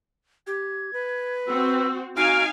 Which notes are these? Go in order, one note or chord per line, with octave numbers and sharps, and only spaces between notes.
G4 G#6
B4
C4 F#4 E6
D#4 F#4 F5 G#5 D7